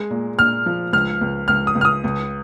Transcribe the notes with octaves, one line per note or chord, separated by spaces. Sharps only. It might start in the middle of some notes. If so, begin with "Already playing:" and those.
Already playing: G#3
A#2
A#2 F6
F3
C#2 F6
C#2
C#2 F6
D#6
C#2
F6
D#6
C#2